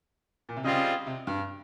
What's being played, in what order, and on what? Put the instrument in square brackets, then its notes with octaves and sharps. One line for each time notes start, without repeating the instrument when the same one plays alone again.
[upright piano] A#2
C3
[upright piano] C#3 [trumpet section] G3 C4 F4 G#4 D#5
[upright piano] C3
G2